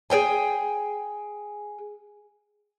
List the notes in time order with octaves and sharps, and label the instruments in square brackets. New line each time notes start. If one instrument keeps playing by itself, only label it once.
[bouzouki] G#4 C#5 G5 G#5